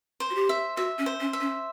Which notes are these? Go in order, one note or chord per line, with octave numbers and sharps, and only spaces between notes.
C5
F#4
G4
E5
F#4 E5
C#4
C5
C#4
E5
C#4